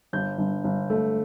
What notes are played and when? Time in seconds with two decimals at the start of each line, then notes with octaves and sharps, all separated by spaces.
0.13 G1 G6
0.38 G1
0.64 G1
0.90 A3